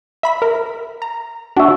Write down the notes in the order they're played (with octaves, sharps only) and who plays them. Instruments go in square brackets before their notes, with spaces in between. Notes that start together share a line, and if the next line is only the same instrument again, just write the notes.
[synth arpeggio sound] E5 B5 B6
A#4
A#5
[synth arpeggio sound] D4 [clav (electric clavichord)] F#4 E5